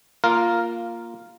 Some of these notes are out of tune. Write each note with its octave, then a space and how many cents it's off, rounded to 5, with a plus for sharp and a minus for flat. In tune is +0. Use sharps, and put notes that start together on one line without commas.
A#3 +0 F4 -5 A#4 +0